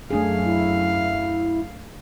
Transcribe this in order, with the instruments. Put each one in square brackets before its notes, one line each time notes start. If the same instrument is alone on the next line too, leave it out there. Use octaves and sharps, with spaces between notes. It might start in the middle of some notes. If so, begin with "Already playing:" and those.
[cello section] F#2 [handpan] A3 D4 G#4 [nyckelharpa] F5
[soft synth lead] E4